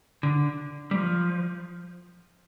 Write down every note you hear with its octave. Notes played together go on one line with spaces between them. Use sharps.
D3
G3
F3